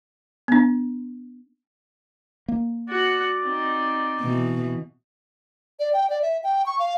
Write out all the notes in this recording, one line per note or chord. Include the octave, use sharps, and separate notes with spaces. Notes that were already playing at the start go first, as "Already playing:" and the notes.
B3 D4
A#3
F#4 D5 F#5
C4 D#4
B2 E3
D5
G5
D5
E5
G5
C#6
F5